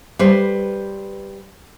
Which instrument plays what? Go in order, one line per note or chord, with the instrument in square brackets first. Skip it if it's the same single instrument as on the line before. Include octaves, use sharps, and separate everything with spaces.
[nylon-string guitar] G3 B4 C5